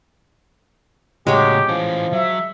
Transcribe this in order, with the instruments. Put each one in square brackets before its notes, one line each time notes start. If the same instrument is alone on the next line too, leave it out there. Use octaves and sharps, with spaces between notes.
[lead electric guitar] A2 C#3 [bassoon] F#3 [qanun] G#3 C#5 [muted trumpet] G4
[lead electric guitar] E3 C#4 [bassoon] F3
[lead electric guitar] F#3 [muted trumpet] E5